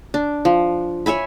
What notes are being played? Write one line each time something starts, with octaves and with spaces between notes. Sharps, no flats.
D4
F3
C#5 E5 G#5 B5